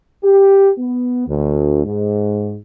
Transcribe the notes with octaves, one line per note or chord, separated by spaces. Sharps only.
G4
B3
D2
G#2